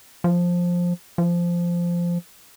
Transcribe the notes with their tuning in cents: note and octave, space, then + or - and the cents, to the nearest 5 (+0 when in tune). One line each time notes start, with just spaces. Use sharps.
F3 +10
F3 -10